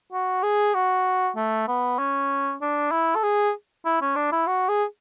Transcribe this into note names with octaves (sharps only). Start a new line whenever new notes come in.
F#4
G#4
F#4
A3
B3
C#4
D4
E4
A4
G#4
E4
C#4
D4
E4
F#4
G#4